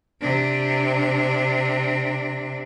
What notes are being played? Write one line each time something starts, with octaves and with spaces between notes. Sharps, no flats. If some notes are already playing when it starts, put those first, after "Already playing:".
C3 D4